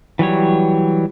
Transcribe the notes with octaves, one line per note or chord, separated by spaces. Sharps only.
E3 F#3 G3 C#5